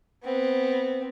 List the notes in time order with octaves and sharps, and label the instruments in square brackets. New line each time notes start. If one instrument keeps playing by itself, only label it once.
[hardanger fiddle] B3 C4